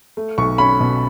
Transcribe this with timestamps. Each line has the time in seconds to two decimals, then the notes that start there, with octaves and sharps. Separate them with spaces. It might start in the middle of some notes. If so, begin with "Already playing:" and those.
0.17 A3
0.38 B1 C#6
0.58 C#4 B5
0.80 B2